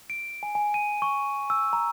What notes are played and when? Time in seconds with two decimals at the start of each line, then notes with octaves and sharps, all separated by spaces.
0.10 D7
0.43 G#5
0.55 G#5
0.74 D#7
1.02 C#6
1.50 E6
1.73 A#5